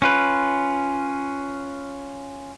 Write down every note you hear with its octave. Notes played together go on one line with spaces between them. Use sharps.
C#4 F4 B4